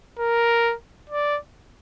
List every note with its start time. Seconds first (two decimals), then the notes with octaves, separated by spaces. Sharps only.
0.19 A#4
1.10 D5